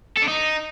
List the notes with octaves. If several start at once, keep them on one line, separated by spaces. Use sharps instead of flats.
A4
D4
D#4